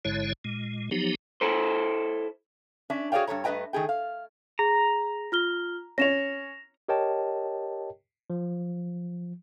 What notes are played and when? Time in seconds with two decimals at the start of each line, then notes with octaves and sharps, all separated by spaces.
0.05 A1 G#2 D3 G#3 E4 C#5
0.45 A#2 G#3
0.91 F3 F#3 B3 D#4 G4
1.41 E4 A4 C5
2.90 C#4 D4 E5
3.12 F#4 G#4 C#5 D5 F5 G5
3.27 G2 C#3 A4 C#5 A#5
3.44 G2 A3 B4 D#5 G5 A#5
3.73 D#3 A3 G#4 G5
3.89 F5
4.59 G#4 A#5
5.32 F4 F6 G7
5.98 C#4 C#5 A#6 E7 F7
6.88 G4 A#4 C#5 D#5 G5 A5
8.30 F3